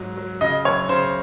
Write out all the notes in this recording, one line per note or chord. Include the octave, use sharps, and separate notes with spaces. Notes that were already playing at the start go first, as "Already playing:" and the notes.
Already playing: G#2 F#3
F#3
C#3 D#5
F#1 C#5
C#3 C5